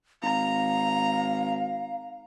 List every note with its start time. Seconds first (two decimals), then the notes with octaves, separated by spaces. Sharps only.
0.23 G#1 F5 A#5